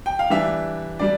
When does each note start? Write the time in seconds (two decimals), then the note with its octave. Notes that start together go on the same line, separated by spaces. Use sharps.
0.06 G5
0.19 F5
0.30 E3 G3 D4 E5
0.99 G3 D4 D5